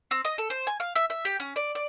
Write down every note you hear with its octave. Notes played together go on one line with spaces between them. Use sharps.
C4
D#5
A4
C5
G#5
F5
E5
E5
G4
C#4
D5
D5